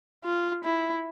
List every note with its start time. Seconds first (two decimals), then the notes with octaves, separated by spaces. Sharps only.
0.24 F4
0.64 E4